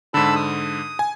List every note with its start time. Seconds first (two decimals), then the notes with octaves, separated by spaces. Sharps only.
0.14 G#2 D3 A5 B5 E6
0.36 D#6
0.99 G#5